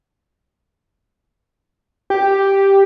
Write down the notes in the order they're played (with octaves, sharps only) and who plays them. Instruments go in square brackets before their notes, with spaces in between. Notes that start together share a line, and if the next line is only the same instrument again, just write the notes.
[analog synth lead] G4